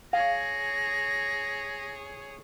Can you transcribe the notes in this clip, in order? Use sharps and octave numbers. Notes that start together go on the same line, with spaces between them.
G#4 C#5 F5 A#6